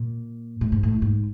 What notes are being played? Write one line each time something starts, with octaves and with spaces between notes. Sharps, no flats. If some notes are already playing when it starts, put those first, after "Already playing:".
Already playing: A#2
A2
G#2
A2
G#2